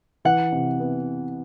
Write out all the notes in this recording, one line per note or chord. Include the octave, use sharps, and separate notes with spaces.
E3 F#5
C3
B3